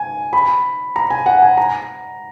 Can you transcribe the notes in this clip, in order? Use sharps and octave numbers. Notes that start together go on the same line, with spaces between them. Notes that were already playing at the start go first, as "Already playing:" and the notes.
Already playing: G#5
B5
A#5
G#5
F#5
G#5
A#5